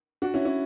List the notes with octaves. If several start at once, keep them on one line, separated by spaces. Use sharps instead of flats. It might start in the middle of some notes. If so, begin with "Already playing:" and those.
D4 F#4
C#4 E4
C#4 E4